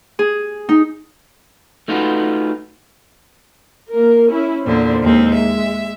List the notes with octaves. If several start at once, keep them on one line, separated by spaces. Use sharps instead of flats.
G#4
D#4
A3 D#4 F4 F#4 B4
A#3 A#4
C#4 E4
E2 A#2 D3 C5
D#2 G#3 C4
E5